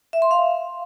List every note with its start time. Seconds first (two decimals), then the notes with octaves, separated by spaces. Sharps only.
0.13 E5
0.22 C6
0.31 F5